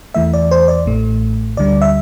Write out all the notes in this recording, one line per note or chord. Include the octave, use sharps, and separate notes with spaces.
E2 E3 A3 E5
D5
C5
D5
A1 A2 A3
D2 D3 G3 D5
E5